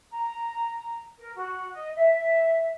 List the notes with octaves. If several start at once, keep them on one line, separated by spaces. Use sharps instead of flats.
A#5
A#4
F#4
D#5
E5